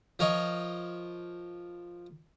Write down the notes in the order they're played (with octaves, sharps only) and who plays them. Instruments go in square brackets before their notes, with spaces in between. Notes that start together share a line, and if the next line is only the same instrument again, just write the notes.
[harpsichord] F3 A#4 C#5 D#5